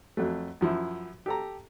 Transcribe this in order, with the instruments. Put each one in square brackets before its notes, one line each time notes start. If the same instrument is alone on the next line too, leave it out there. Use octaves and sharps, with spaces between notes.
[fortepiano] F2 F#3 A3
F#2 F3 E4
G4 A4 A#5